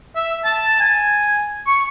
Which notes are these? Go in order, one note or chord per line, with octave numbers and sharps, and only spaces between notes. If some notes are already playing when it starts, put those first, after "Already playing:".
E5
A5
G#5
C#6